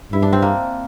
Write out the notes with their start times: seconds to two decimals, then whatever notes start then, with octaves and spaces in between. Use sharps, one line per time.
0.12 G2 E4
0.22 D4
0.33 C4
0.42 A#3